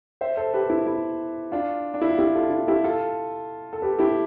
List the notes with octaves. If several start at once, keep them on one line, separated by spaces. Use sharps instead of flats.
C5 E5
A4 C5
G4 B4
E4
E4
D4 F4
D4
E4
F4
E4 G4
F4 A4
E4
E4 G4
F4 A4
A4
G4 B4
E4 G4